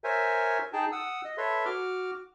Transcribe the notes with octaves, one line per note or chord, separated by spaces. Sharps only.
A#4 C5 C#5 E5 G#5
D#4 G#4 G5 A5
F#5 D#6 E6
D#5
A4 B4 C#5 E5 C6
F#4 D6 F6